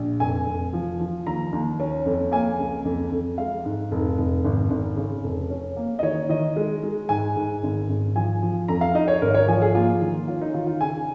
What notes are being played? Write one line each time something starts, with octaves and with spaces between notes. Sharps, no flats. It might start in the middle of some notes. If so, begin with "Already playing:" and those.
Already playing: A#1
F1 G#5
F1
F3
F3
D#2 A#5
D#2
C#4
F2
A#3 G#5
C#2
F2
F2
G#3 F5
G#2
F1
F1
G#1
G#1
C#3
F1
C#4
A#3
D#5
D#3 C#5
D#3 D#5
G#3
G#3
G#2 G#5
G#2
G#1
G#1
F3 G#5
F3
F2 A#5
F5
D#4 D#5
C#5
G#1 A#4
C#5
F3 G#5
G#4
A#3 F4
D#3
C#4 F4
D#4
D#3 F4
F4
C#3 G#5